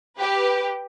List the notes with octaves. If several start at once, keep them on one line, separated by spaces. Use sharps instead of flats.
G4 B4